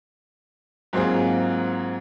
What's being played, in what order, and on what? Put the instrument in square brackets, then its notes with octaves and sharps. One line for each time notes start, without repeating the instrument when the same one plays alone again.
[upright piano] G#2 F#3 A#3 C4 F4 G#4